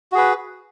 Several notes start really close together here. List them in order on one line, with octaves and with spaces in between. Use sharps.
F#4 G#4 B4